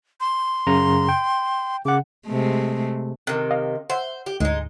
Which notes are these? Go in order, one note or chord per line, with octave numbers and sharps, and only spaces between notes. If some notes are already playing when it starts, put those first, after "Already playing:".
C6
F#2 C#3 A#5
G5
C#3 F#5 D6
C3 G#3 A3
C3 D#3 F#6
D#5 F5
C5 E5 F#5
G4
D2 G#2 G#3 D#4